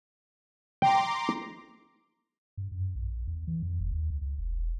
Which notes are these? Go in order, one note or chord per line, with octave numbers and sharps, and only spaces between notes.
G5 A#5 C6 D6
G2
F#2
A#1
E2
E3
F2
F#1
D#2
C#2
C#2
E1